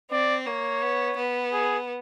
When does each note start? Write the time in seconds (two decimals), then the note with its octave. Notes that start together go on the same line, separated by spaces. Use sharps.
0.11 C4 D5
0.46 A#3 C#5
0.82 B3
1.17 B3
1.53 G#4